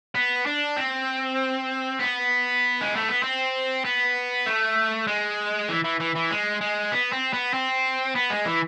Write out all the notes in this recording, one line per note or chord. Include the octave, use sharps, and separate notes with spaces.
B3
D4
C4
B3
G#3
A3
B3
C4
B3
A3
G#3
E3
E3
E3
E3
G#3
G#3
B3
C4
B3
C4
B3
G#3
E3